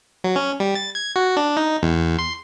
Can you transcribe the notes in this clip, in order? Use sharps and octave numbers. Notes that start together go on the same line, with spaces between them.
F#3
C#4
G3
A6
G#6
F#4
D4
D#4
E2
C6